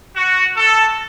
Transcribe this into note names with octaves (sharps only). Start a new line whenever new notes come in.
F#4
A4